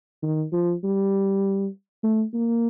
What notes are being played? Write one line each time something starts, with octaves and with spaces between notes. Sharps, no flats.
D#3
F3
G3
A3
A#3